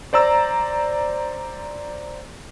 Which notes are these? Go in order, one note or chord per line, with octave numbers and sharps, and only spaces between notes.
C5 D5 A#5 E6